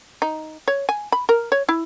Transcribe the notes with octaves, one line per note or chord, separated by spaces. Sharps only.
D#4
C#5
G#5
B5
A#4
C#5
E4